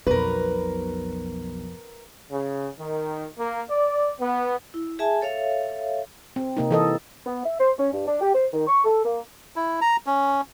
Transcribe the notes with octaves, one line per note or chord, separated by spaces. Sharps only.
B1 F2 B2 A#4 B4
C#3
D#3
A#3
D5
B3
E4
G#4 E5 G#5 A5
A4 C#5 E5 F5
C4
C3 A#3 D#4
E3 A4 D#5
B3
E5
C5
C#4
G2
D4
G4
C5
D#3
C#6
A4
A#3
E4
A#5
C#4